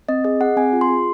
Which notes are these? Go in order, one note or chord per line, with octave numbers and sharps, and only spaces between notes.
C4 D#5
G#4 D#5
G#4 F#5
C4 G#5
F4
C6
G#4